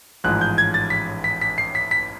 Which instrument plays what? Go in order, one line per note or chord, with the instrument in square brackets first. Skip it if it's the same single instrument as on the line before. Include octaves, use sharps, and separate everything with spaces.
[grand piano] A1 G#2 F3 G#3 F#6
G6
G#6
A6
B6
B6
B6
C7
B6
B6